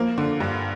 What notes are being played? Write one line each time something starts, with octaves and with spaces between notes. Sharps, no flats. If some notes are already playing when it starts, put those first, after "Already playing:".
Already playing: F3 A#3
D3
G2